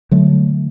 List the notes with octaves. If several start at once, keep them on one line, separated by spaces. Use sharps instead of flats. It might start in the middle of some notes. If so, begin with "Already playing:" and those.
D3 F#3 A3